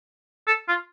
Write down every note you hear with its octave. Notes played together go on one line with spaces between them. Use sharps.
A4
F4